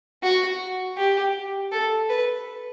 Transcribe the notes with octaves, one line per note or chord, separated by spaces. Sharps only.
F#4
G4
A4
B4